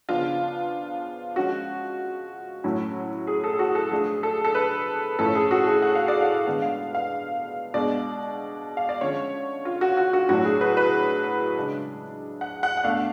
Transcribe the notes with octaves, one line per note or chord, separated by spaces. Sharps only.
C#3 F3 B3 D4 F4
F3 G#3 C#4 F#4
A2 F#3 A3 C#4
G#4
A4
G#4
F#4
A4
F3 A3 D4 G#4
A4
A4
B4
A2 F3 A3 C#4 A4
G#4
F#4
G#4
F#5
F5
D5
F5
D3 G#3 B3 D4
F5
F5
B2 G#3 D4 D5
F5
D5
D3 F3 G#3 C#4 C#5
F4
F#4
F#4
F#4
A2 F#3 A3 D4 F#4
G#4
B4
B4
C#3 G#3 D4
F#5
F#5
F#5
B2 A3 D4 F5